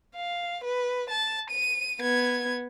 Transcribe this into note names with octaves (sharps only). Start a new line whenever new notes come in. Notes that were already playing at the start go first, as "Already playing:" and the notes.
F5
B4
A5
D#7
B3 G#6